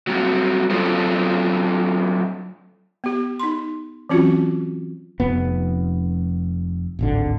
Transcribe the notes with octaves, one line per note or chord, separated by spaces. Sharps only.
F#3 G3 C4 F#4
F#3 C4 D4 F4 A4 C5
B3 G4
D#4 C6
E3 F#3 C4 C#4 F4 F#4
F1 B3
D1 G#1 D3